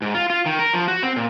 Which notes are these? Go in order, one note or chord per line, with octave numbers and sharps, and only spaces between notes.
G#2
F4
F4
D#3
A#4
F3
F#4
C4
A#2